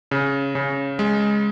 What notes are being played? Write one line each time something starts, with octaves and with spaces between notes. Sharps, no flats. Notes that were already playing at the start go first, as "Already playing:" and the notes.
C#3
C#3
G#3